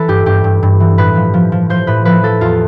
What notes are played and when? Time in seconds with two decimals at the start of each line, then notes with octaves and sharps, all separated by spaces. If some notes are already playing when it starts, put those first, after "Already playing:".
Already playing: E3 A4 B4
0.08 G2 G4
0.26 G2 G4
0.44 G2
0.63 G2
0.80 E3
0.98 A2 B4
1.16 F3
1.34 F3
1.52 F3
1.70 F3 C5
1.87 A2 B4
2.05 F3 B4
2.23 F3 A4
2.41 E2 F4